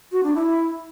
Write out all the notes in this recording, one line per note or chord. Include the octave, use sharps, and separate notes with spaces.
F#4
D4
E4